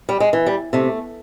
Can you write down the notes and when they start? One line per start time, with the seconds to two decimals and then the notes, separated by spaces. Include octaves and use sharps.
0.09 G3
0.20 G#3
0.33 E3
0.46 G3
0.73 C3 A3